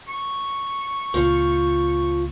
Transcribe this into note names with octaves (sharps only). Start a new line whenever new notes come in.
C#6
C#2 A#2 F3